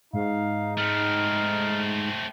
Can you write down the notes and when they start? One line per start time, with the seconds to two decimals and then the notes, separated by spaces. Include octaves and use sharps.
0.13 G#2 D#4 F5
0.78 A3 C4 F6